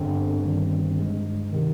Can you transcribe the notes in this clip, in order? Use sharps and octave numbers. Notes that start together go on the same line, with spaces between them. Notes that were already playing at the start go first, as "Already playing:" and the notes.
Already playing: G1 G2 D3 C4
G1 G2 D#3 G3
G2 D3 G#3
C3 D#3